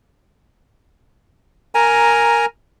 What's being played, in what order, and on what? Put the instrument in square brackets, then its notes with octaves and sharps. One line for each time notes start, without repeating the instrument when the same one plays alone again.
[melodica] A#4 G#5 A#5